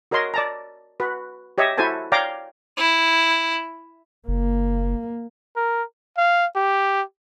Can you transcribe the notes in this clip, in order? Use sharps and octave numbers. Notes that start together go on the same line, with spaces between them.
F#4 A#4 C#5 D#5 C6
D5 A5 A#5
F#4 B4
G4 C#5 D#5 E5
E4 F#4 A4 C5 G#5 A5
C#5 D5 F5 G5 A#5 D6
E4
F#1 A#3
A#4
F5
G4